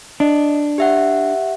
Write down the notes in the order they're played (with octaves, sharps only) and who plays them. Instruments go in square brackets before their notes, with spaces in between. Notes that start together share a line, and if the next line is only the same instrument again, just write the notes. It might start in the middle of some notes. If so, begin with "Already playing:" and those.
[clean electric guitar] D4 [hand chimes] D#5
[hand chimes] G4 E5 F#5